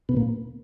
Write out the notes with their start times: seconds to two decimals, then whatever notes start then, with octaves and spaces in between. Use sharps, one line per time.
0.09 B2 B3
0.16 A#2 A#3